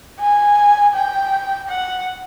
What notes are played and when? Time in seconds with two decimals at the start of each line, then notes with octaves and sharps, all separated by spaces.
0.20 G#5
0.95 G5
1.68 F#5